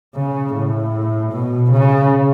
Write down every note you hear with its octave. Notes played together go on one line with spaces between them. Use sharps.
C#3
A2
B2
C#3